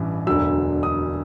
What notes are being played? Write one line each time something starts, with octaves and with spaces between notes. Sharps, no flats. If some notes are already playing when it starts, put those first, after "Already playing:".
Already playing: A1 G2 E3
E1 D2 D3 F#3 E6
D#6